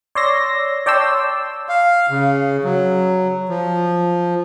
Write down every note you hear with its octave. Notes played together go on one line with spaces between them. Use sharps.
C#5 D5 C6 E6 A#6
C#5 D5 G5 A5 C6 E6
F5
C#3
F#3
F3